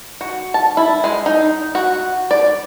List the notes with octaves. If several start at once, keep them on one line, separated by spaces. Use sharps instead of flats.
F#4
A5
E4
G#3
D#4
F#4
D5